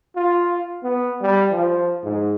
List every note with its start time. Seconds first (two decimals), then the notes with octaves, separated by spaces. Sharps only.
0.16 F4
0.83 B3
1.21 G3
1.51 F3
2.04 G#2